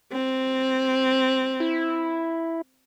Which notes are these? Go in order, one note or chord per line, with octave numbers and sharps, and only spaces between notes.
C4
E4